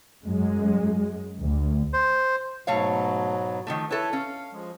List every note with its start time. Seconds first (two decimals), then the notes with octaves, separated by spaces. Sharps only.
0.24 F#2 G#3
1.40 D2
1.93 C5
2.67 G#2 B2 F#3 A3 C#5 F5
3.67 D#3 F3 A3
3.90 E4 A4 B4 C#5 E5
4.13 C#4 F5
4.52 F3 G#3